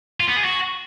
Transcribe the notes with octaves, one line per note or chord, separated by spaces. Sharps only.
F4
B3
G#4
F#4